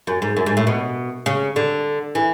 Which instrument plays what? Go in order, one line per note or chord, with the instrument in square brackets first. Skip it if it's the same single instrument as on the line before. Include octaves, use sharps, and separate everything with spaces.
[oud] F#2
G#2
F#2
G#2
A2
B2
C#3
D3
E3